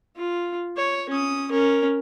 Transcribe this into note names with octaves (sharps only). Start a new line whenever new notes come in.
F4
C#5
C#4 D#6
C#4 A#4